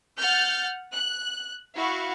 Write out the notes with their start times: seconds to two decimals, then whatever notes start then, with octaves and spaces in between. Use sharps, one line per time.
0.19 F#5 F6 G6 A6
0.93 F#6
1.75 E4 F#4 F5 C#6